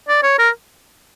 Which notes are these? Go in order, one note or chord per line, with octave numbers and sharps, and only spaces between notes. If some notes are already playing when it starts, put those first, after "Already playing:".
D5
C#5
A#4